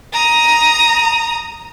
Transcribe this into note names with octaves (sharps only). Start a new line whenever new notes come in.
A#5 D#6